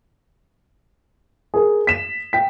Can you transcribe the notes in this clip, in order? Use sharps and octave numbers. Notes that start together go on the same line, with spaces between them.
G#4 A#4
B6 E7
G5 B6